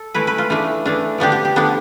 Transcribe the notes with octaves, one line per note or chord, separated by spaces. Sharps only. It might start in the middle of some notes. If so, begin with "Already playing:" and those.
Already playing: A4
E3 A3 E4 B4
B4
F4
E3 A3 D4
E3 A3 D4
D3 F3 B3 D4 G4
G4
G4
D3 F3 B3 D4